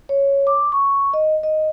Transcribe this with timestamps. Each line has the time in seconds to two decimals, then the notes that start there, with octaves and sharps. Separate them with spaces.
0.09 C#5
0.47 D6
0.72 C#6
1.13 D#5
1.43 D#5